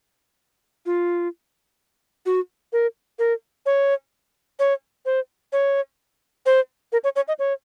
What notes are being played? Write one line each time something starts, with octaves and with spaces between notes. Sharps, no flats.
F4
F#4
A#4
A#4
C#5
C#5
C5
C#5
C5
A#4
C#5
C#5
D#5
C#5